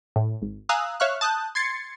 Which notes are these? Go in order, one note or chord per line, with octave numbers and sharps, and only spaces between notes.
A2
G#1
F5 G#5 A#5 D#6 E6 F#6
C#5 E5 F5 C#6 F6 F#6
A5 D#6 F#6 G6
C6 G#6 A6 C7 C#7